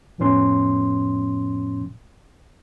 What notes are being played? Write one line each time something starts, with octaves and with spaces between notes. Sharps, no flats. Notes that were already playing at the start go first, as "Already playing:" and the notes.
F2 A2 F3 B3 C#4 C6